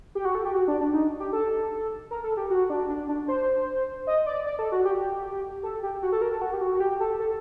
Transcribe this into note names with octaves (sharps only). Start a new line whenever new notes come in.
G4
F#4
A4
G4
F#4
D4
D4
D#4
G4
A4
A#4
A4
G4
F#4
D4
D4
D4
C5
D#5
D5
D5
A4
F#4
G4
A4
G4
F#4
A4
A#4
A4
F#4
G4
F#4
F#4
G4
A4
A4